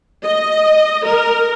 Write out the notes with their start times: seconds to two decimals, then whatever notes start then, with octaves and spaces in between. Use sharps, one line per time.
0.24 D#5
1.04 A#4